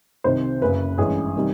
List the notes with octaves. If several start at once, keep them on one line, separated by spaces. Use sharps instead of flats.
C2 C3 D#3 C5
F#1 F#2 C#3 B4
A1 G2 E3 G#3 G#4
C3 D#3 G3